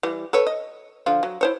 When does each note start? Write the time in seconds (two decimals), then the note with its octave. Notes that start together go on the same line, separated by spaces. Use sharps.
0.03 E3 G3
0.33 A4 B4 C#5
0.47 D#5
1.06 D3 F3 F4
1.23 F#3
1.41 E4 C5 C#5